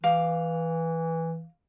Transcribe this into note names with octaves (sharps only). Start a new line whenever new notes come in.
E3 F5 D6